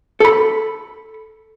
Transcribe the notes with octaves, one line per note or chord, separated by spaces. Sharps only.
A4 B5